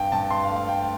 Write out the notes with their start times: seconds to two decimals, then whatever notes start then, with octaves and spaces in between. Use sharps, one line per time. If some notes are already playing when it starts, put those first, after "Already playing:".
Already playing: G2 G5
0.12 G2 A5
0.31 G2 C6
0.44 F5
0.50 A3
0.56 F5
0.69 A3 G5